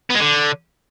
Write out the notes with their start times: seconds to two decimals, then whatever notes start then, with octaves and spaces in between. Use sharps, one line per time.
0.10 B3
0.15 G#3
0.20 D3